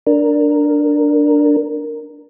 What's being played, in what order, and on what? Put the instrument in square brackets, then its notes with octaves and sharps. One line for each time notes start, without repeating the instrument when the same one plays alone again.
[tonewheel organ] D4 A#4